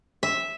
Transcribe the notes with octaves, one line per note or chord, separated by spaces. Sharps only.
E5